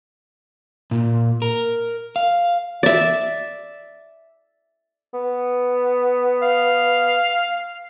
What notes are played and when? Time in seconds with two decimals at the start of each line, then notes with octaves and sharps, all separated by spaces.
0.91 A#2
1.42 A#4
2.16 F5
2.83 D5 E5
5.14 B3
6.42 F5